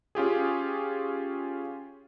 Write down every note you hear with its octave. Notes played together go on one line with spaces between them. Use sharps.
C#4 F4 G4 G#4